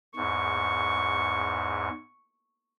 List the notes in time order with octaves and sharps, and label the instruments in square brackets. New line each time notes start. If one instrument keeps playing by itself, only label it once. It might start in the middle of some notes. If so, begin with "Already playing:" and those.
[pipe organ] E2 G#2 [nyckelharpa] C#6